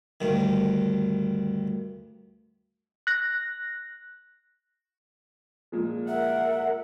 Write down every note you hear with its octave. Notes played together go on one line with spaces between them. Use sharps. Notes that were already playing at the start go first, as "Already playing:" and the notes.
D2 G2 D#3
F#6 A#6
A#2 F3 G#3
A#4 E5 F#5